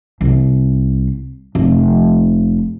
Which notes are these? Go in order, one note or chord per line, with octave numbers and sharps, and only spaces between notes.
C2
F1